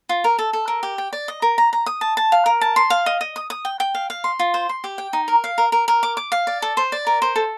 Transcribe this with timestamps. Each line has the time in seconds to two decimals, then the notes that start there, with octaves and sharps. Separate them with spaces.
0.09 F4
0.24 A#4
0.39 A4
0.53 A4
0.68 A#4
0.83 G4
0.98 G5
1.13 D5
1.28 D#5
1.42 A#4
1.58 A#5
1.73 A#5
1.86 D#6
2.01 A5
2.17 A5
2.32 F5
2.46 A#4
2.61 A5
2.76 C6
2.90 F5
3.06 D#5
3.21 D#5
3.36 D#6
3.50 D#6
3.65 G5
3.80 G5
3.94 F5
4.10 F5
4.24 C6
4.39 F4
4.54 C5
4.69 C6
4.84 G4
4.98 G5
5.13 D#4
5.28 A#4
5.44 F5
5.58 A#4
5.72 A#4
5.88 A#4
6.03 D6
6.17 D6
6.32 F5
6.47 D5
6.62 A4
6.77 C5
6.92 D5
7.07 A#4
7.22 C5
7.36 A4